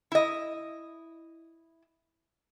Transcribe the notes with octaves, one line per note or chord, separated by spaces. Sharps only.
E4 D#5